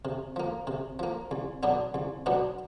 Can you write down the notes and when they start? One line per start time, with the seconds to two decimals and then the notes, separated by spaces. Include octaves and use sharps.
0.05 C3
0.36 F3 A#3
0.67 C3
0.99 F3 A#3
1.31 C2
1.63 B2 F#3 B3 D4
1.94 C2
2.26 B2 F#3 B3 D4